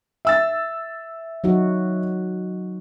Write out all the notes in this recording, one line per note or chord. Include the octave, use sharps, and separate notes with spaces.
E5 E6 A6
F#3 D#4 F#4